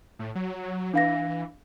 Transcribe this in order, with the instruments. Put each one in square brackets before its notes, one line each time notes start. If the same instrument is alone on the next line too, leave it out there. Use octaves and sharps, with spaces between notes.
[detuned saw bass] A2
F#3
[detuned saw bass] E3 [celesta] D4 F5 A#6